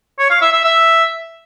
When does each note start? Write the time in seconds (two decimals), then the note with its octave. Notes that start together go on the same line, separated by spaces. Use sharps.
0.19 C#5
0.30 F5
0.41 E5
0.53 E5
0.64 E5